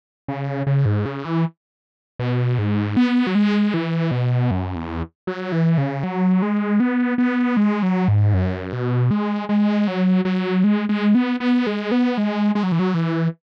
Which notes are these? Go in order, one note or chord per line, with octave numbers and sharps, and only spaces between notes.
C#3
C#3
G#2
C#3
E3
B2
G#2
B3
F#3
G#3
E3
B2
F#2
E2
F#3
E3
C#3
F#3
G#3
B3
B3
G#3
F#3
G#2
F#2
B2
G#3
G#3
F#3
F#3
G#3
G#3
B3
B3
G#3
B3
G#3
G#3
F#3
E3
F#3
E3